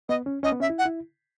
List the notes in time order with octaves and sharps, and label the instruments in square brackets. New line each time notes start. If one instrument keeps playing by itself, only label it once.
[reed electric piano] B3 [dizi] D#5
[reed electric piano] C#4
[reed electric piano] C#4 [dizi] D#5
[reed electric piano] B3
[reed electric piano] C#4 [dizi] E5
[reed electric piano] E4
[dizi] F#5
[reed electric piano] E4